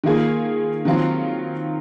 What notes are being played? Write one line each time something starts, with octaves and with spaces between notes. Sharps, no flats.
D#3 A#3 F4 G#4
D#3 F#3 C4 F4